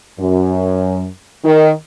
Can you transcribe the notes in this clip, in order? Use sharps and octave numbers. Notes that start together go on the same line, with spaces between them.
F#2
D#3